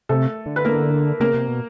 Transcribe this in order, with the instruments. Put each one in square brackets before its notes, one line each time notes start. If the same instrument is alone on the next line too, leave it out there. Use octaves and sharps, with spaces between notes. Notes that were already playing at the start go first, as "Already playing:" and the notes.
[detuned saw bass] C3 [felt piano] A3 A4
[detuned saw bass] D3
[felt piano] B4
A#3 A#4
[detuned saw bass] C#3 [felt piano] A#3 A#4
[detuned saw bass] C3
B2